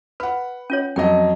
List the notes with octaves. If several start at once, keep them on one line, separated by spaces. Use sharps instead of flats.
B4 F#5 B5
C#4 F4 C#5
F2 F#3 D#5 G5